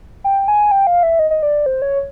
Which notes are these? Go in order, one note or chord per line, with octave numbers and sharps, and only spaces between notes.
G5
G#5
G5
F5
E5
D#5
D#5
D5
C5
C#5